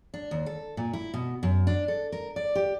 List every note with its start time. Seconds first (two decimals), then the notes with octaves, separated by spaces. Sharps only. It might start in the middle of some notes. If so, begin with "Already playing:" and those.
0.14 D4
0.31 D#2
0.46 A4
0.77 A#2
0.93 E4
1.14 B2
1.43 F#2
1.67 D4
1.88 A4
2.12 A#4
2.36 D5
2.55 G4